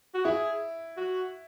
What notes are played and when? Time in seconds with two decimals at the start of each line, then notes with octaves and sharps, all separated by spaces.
0.14 F#4
0.24 E4 G#4
0.97 F#4